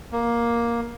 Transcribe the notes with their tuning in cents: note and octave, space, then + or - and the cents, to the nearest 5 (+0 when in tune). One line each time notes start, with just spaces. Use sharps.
A#3 +10